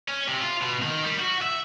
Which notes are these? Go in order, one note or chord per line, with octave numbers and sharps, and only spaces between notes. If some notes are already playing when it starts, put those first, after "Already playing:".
C#4
C3
F4
B2
D#3
G3
F#4
E5